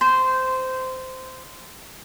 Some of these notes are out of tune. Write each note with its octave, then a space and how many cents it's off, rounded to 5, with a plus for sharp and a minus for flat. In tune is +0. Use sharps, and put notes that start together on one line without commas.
C5 -15